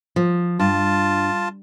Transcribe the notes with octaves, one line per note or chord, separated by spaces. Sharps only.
F3
G2 F4 A5